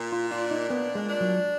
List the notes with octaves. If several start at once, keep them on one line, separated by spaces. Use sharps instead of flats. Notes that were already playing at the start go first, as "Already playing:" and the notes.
Already playing: A#2
F4
D4 F4
D#4
A#2 B3
G#3
D4
F#3